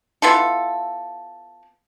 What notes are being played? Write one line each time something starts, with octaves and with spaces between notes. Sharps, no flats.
B3 E4 F4 A4